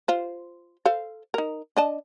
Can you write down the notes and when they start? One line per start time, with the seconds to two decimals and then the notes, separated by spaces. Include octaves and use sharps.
0.08 F4 C5
0.86 A4 C5 F5
1.34 D#4 A#4
1.77 D4 D#5 A5